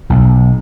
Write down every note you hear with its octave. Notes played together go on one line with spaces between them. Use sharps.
B1